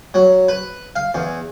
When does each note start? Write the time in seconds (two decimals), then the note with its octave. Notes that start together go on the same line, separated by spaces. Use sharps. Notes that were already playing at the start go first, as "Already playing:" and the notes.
0.14 F#3
0.48 B4
0.96 F5
1.14 E2